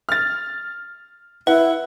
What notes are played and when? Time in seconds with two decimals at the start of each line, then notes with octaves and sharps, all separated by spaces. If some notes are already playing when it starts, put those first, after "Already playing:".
0.09 F6 A6
1.47 E4 B4 F#5